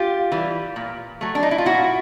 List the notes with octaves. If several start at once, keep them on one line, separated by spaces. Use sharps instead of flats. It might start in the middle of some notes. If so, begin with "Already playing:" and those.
Already playing: F4 G4
E3 G3
A#2
F#3 A3
D4
D#4
E4
F4
A#2 E4 F#4